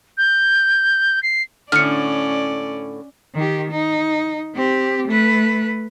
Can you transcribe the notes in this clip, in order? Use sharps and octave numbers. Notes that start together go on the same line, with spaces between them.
G6
C7
A2 D3 C#4 D5 F6 C#7
D#3 G4
D#4
C4 G4
A3 B4